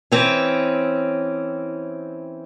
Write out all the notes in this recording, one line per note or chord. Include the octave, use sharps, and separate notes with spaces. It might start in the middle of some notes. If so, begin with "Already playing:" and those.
E3 C4 C#4